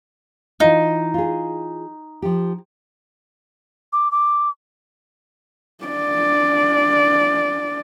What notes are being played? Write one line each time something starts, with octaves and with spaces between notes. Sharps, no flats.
E3 D#4 F4
F4 G#4
F3 G4
D6
D6
D4 D5